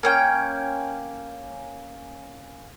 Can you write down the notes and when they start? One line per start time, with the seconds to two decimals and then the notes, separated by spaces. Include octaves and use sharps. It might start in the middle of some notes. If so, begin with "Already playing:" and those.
0.03 A#3 C#4 G5